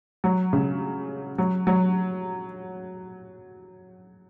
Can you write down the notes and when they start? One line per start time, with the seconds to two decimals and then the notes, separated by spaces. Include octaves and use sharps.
0.24 F#3
0.53 C#3
1.38 F#3
1.67 F#3